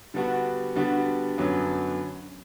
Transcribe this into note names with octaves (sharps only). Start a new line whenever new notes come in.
D3 G3 B3 D4 F#4
D3 G3 B3 D4 F#4
F#2 D3 F#3 B3